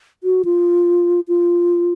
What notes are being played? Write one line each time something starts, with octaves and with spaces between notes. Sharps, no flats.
F#4
F4
F4